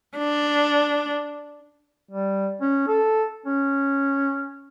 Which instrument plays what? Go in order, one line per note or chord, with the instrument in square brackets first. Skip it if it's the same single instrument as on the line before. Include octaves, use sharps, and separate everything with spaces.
[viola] D4
[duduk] G3
C#4
A4
C#4